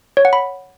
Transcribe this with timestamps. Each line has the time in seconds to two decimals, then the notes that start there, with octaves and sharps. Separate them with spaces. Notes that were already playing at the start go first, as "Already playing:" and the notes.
0.17 C#5
0.25 F#5
0.33 B5